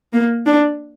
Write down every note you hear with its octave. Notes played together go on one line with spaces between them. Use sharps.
A#3
D4